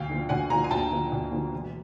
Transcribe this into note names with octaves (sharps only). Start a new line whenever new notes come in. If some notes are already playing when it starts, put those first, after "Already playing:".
Already playing: D2 F5 G5
D3 F3
D2 F#5 G#5
D3 F3 G#5 A#5
G#5
D2 G5 A5
D3 F3
D2
D3 F3
E1